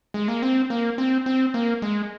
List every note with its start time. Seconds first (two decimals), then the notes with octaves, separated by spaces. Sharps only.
0.14 G#3
0.28 A#3
0.42 C4
0.70 A#3
0.98 C4
1.26 C4
1.54 A#3
1.82 G#3